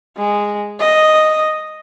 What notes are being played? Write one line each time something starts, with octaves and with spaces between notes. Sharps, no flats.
G#3
D#5